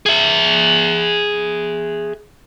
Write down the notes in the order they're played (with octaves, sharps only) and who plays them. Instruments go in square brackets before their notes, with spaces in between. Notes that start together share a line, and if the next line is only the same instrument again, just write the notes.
[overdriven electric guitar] G#4 E5